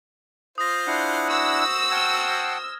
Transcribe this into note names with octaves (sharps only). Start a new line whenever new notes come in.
F4 C5 D#6 A#6
D4 E4 F#5
F#4 C5 E6
F#5 G5 A5 F6 G#6